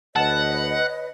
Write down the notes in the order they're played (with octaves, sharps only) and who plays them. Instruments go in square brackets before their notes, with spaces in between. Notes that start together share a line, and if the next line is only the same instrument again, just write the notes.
[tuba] D2 [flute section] B4 C#5 D#5 [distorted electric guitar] F#5 [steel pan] A5